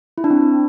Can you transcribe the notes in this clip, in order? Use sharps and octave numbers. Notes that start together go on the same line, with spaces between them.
E4
D4
C4